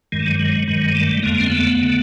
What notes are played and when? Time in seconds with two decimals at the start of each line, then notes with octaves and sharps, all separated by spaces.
0.12 G2 D#3 G#3
0.20 A3
0.26 F#3 G#3
0.39 F#3 G#3
0.67 G2 D#3 F#3 G#3
0.95 G3 A3
1.22 F2 D3 G#3 A#3
1.40 C4
1.50 A3 B3
1.82 D3